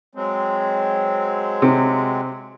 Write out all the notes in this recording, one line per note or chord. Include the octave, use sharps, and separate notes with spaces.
F#3 G#3 C4
C3